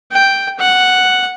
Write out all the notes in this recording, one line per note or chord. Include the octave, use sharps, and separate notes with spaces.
G5
F#5